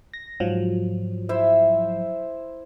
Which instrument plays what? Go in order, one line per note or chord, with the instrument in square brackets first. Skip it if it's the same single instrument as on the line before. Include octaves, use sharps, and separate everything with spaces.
[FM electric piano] A#6
G#2 F3 F#3
[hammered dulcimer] E4 C5 E5